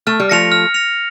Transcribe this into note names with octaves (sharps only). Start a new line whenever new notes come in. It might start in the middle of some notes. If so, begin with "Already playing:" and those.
A3 F6
G3
F3 A3 A#6 C#7 F7
F6
A#6 C#7 F7